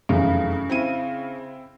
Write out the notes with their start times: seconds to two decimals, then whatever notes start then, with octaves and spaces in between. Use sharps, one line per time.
0.09 F1 F#2 C#3 E3
0.69 C4 E4 D#7